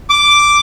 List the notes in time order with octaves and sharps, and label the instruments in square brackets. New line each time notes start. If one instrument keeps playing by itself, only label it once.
[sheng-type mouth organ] D6